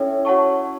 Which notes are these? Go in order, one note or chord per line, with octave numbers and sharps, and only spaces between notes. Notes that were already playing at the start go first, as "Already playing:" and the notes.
Already playing: C#4 E4 A4 E5 G5
F#4 C#5 F#5 A5 C#6